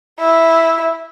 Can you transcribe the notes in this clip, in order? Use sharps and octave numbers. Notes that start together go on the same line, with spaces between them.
E4